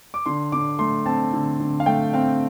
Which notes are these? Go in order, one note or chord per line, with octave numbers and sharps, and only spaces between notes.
D6
D3 C6
D3 D6
A3 C6
C4 A5
D3
D3
F5
A3 G5
C4 F5